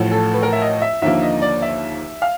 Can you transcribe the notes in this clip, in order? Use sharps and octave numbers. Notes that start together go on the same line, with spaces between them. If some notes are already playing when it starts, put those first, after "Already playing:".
Already playing: A1 A2 F3 A3
A4
B4
A#4
E5
D#5
E5
D#2 D3 F3 A#3 E5
D#5
D5
E5
F5